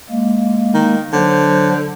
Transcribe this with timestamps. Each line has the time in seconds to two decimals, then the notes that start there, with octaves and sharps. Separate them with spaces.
0.10 G#3 A#3
0.74 D#3
1.13 D3 F#3 C5